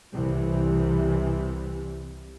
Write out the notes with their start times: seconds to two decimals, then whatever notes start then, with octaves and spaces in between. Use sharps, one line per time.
0.12 C2 C3 E3